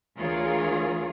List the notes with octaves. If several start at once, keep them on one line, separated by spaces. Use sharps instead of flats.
D2 E3 F4 G#4 A#4 C#5